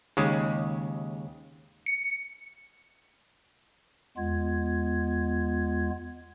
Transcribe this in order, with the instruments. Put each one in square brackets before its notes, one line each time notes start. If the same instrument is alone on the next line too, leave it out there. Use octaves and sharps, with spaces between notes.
[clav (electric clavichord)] D#2 C#3 G#3
[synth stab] C#7
[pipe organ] E2 G#3 B3 F4 G#6